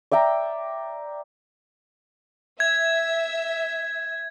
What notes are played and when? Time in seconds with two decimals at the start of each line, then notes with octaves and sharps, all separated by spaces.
0.12 D5 E5 G5 A#5
2.60 E5 G#6